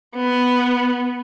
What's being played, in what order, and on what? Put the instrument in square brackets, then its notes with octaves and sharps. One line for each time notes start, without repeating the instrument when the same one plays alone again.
[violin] B3